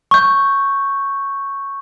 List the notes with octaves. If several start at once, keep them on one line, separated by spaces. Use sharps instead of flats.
C#6 G6